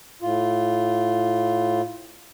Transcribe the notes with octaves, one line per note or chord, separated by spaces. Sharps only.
A2 F4